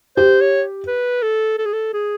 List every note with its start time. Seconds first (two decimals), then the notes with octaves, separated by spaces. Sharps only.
0.17 G4 C5
0.41 C#5
0.87 B4
1.23 A4
1.58 A4
1.66 G#4
1.74 A4
1.93 G#4